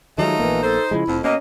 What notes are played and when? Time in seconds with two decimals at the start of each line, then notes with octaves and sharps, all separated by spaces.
0.18 D#3 F3 F#3 G#3 A3 D#4
0.39 A#1 E3 A#3 B3
0.63 D#4 A4 C5
0.91 C#3 F3 G#3 E4
1.08 F1 F2
1.24 B2 A#3 C#4 D#5